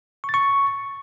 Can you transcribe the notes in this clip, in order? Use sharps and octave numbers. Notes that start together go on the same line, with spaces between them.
C#6
A6
C#6